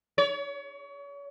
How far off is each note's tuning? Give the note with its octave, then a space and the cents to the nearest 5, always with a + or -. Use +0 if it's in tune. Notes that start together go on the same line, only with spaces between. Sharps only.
C#5 +35